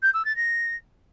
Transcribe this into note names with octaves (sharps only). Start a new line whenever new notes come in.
G6
E6
A6
A#6